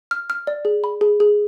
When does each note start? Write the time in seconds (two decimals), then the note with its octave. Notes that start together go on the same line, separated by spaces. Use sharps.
0.11 F6
0.30 F6
0.47 D5
0.65 G#4
0.84 B5
1.01 G#4
1.20 G#4